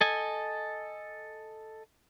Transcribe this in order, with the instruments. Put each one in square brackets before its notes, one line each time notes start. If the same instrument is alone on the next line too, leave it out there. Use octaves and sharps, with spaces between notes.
[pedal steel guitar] A4 D#5 G#5